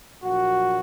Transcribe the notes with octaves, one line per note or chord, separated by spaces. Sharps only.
A#1 A#2 F#3 F#4